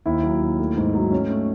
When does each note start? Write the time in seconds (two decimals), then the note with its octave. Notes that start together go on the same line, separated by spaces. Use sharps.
0.06 D#2 E4
0.23 F#3
0.41 D#2
0.59 A3
0.77 G#2
0.94 F#3
1.12 A3 C#4
1.30 A3